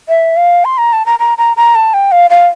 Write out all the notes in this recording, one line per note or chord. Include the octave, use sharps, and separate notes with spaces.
E5
F5
C6
A#5
A5
A#5
A#5
A#5
A#5
A5
G5
F5
F5